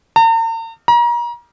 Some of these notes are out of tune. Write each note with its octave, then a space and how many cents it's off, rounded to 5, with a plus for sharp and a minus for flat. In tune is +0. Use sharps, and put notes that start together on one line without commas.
A#5 -45
A#5 +35